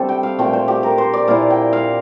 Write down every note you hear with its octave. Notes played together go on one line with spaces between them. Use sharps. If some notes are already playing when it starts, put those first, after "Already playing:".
Already playing: C3 G3 A3 C4 D4 G4 A4
G5
F5
A#2 F3 A3 C4 G5
C5
G4
A#4
C5
D5
A#2 F3 A#3 E4 F5
G5
F5